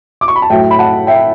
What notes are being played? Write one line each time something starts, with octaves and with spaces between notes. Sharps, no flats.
D6
C#6
B5
A5
A2 F#3 E5 G5
B5
F#5 A5
E5 G5